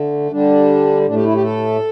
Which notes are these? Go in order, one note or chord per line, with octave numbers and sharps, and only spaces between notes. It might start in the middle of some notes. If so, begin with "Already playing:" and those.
Already playing: D3 A3
D3 G3 D4
A2 A3 D4
G4
E4
G4
A4